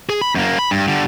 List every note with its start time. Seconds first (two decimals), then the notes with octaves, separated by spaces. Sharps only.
0.10 G#4
0.21 B5
0.35 F#2 A#3
0.59 B5
0.71 G2
0.88 D3 G3